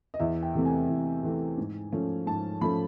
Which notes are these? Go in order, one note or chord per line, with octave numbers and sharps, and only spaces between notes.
D#5
E2 E5
G5
C3 E3 A3 C4
G#5
E2
C3 E3 A3 C4
G#2
F3 A3 C#4
G#2 A5
F3 A3 C#4 B5